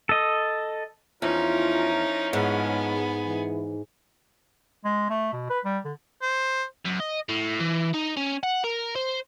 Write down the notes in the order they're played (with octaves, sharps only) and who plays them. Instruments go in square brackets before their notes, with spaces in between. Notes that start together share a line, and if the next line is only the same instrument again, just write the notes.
[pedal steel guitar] A4 D#5
[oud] E2 [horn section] F3 C#4 A#4 [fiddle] D#4 [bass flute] F4
[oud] G#2 [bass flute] G#3 [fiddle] B3 G#4
[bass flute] E3
[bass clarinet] G#3
A3
B2
B4
G3
D3
[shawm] C5
[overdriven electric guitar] F#2
D#5
A2
E3
D#4
C#4
F#5
A#4
C5